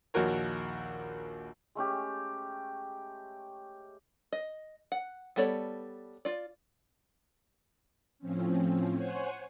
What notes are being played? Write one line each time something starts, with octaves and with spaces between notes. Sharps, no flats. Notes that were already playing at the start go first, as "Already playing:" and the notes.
A#1 D#2 F#4 A#4 C#5
G#3 A3 C#4 G4
D#5
F#5
G3 B3 A4 C#5 D5
F4 D5
A2 F3 C4 C#4
C5 C#5 F#5 G#5